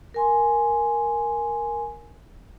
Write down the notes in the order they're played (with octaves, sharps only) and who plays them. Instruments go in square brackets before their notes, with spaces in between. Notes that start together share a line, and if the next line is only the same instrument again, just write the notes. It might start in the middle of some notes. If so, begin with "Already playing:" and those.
[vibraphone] A#4 G#5 C6